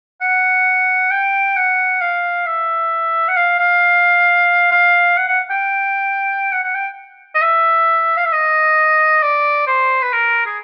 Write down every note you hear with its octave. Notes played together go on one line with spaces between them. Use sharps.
F#5
G5
F#5
F5
E5
F#5
F5
F5
F5
F#5
F#5
G5
F#5
F#5
G5
D#5
E5
F5
E5
D#5
D5
C5
B4
A#4
G#4